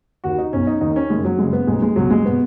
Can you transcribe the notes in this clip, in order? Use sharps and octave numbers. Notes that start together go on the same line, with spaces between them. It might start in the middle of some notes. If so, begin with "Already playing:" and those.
D#2 D#3 F#4
D#4
B1 B2 C#4
D#4
D#2 D#3 D#4
C#4
F#1 F#2 D#3 G#3
F#3
F#1 F#2 C#3 G#3
B3
B1 B2 G#3
G#3
C#2 B2 F#3
G#3
B2 B3